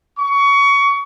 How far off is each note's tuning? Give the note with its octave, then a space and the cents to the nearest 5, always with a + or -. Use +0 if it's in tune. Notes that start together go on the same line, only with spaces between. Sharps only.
C#6 +25